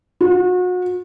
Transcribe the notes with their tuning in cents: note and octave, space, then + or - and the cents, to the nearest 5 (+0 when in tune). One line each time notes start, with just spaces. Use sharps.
F#4 -35